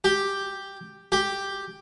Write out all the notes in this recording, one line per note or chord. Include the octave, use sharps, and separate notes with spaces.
G4
G4